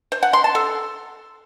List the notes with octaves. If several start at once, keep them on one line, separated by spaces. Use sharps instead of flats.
C5
F#5
C6
A5
A4